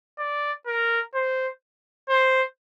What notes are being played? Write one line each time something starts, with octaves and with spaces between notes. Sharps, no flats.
D5
A#4
C5
C5